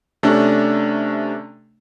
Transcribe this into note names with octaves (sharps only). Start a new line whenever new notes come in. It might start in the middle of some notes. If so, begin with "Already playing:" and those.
C3 A3 C#4 D4